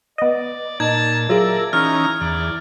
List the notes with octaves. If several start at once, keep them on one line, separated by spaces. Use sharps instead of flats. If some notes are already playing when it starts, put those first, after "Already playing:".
B3 D5 D#5
A#2 D#4 A5 G#6
F#3 F4 G#4 A#4 D5 E5
E3 C#4 D#4 A#5 F6
E2 D5